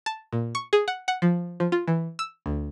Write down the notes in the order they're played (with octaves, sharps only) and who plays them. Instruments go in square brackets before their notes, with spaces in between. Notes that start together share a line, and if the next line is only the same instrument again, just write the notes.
[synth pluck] A5
A#2
C#6
G#4
F#5
F#5
F3
F3
F4
E3
E6
D2